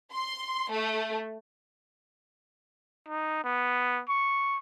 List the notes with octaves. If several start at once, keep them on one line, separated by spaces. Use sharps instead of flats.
C6
A3
D#4
B3
C#6